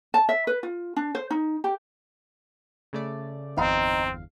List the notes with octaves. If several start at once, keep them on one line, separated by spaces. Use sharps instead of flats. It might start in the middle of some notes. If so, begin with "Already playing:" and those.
A5
E5
B4
F4
D4
C5
D#4
G4
C#3 A3 D5
G1 E2 C4 D#4 F5